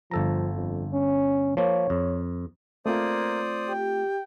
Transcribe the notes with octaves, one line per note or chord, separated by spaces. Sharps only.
G1 F3 A4 A#5
F2
C#4
F3 A#3 C#5
F2
A3 A#3 C4 F4 C5 D5 D#6
G4 G5